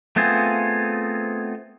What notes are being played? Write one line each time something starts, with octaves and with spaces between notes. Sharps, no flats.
A3 B3 C4 F4 G#4